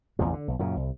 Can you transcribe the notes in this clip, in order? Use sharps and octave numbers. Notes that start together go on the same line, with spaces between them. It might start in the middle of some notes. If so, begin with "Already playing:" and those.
A1 E2 C3 F3
D3
B1
F#2 A#2 C#3
C2